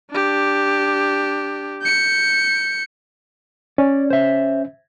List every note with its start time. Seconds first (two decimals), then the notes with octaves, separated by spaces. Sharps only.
0.11 D4 G4
1.82 G6 C#7
3.78 C#4 D5
4.10 C5 E5